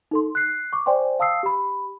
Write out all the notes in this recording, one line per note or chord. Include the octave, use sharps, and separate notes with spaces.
D#4 A4 C6
F#6 C7
C#6 D6
C5 D5 G5 G#5 C6
F5 A5 D#6 E6 C7
G4 B5